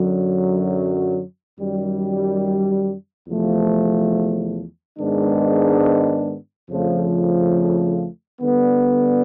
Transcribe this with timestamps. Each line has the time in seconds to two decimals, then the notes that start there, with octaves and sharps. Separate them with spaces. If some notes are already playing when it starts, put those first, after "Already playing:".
Already playing: F#2 D3 F#3
1.56 F#2 D#3 G3
3.27 E2 C3 F3 A3
4.98 G#2 D#3 G#3 B3 D4
6.69 F2 C#3 F3 A3
8.40 D3 G3 B3